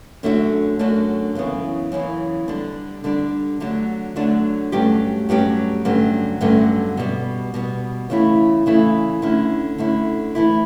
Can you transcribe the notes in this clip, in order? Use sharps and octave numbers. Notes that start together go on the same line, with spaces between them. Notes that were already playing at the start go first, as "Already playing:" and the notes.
F#2 D3 A3 D4 F#4
F#2 D3 A3 D4 F#4
F#2 C#3 E3 B3
F#2 C#3 E3 B3
D3 G3 D4
D3 G3 D4
D3 F#3 A3 D4
D3 F#3 A3 D4
G2 F#3 A3 C#4 G4
G2 F#3 A3 C#4 G4
G2 D3 F#3 A3 C#4
G2 D3 F#3 A3 C#4
B2 G3 B3
B2 G3 B3
C#3 E3 A3 E4
C#3 E3 A3 E4
D3 A3 C#4 E4
D3 A3 C#4 E4
E3 A3 E4